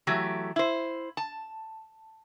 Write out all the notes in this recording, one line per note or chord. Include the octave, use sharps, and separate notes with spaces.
E3 F#3 A3 G4
E4 C5
A5